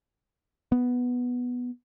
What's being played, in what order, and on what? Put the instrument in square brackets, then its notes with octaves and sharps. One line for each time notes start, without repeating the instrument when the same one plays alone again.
[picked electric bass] B3